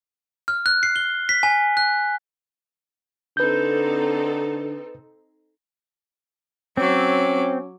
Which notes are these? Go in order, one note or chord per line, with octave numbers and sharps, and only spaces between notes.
F6
F#6
C7
G7
B6
G#5
F#6
D3 C4 D#4 A4 B4 G6
F#3 C4 C#4 D6